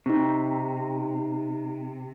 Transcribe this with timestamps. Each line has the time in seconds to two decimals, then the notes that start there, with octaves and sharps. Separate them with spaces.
0.06 C3 C4 D#4